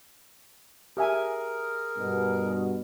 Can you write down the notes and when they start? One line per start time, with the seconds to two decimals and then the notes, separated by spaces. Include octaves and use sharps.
0.97 G4 G#4 A#4 E5 G#5
1.98 G2 B2